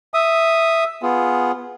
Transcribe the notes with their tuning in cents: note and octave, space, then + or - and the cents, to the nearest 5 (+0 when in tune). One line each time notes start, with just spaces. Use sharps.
E5 +0 D#6 +0
B3 +0 F4 +0 G#4 +0